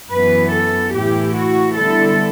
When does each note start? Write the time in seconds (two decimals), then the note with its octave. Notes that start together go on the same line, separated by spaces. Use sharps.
0.11 F#2 E3 B3 B4
0.53 A4
0.93 A2 E3 A3 E4 G4
1.34 F#4
1.75 D3 G3 B3 E4 A4